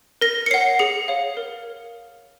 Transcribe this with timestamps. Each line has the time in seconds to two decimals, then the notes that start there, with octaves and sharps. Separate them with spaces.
0.21 A#4 A#6
0.46 C#7
0.51 C#5 F#5 C7
0.79 G#4 C#7
1.08 C#5 F5
1.37 A#4